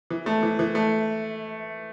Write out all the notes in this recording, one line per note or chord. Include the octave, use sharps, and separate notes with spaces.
E3
A3
E3
E3
A3